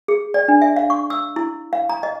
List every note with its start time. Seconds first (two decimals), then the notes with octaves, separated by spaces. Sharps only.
0.08 G#4
0.34 D5
0.48 D4
0.62 E5
0.76 F5
0.90 C#6
1.10 E6
1.36 E4
1.73 F5
1.89 A#5
2.03 D#5